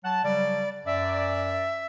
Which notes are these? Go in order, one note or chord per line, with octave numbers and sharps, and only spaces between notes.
F#3 F#5 A5
C#3 F#3 G3 D5
F#2 D5 E5